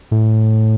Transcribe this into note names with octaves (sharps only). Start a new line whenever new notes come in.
A2